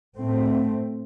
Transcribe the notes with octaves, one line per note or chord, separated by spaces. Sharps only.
A2 A3 C4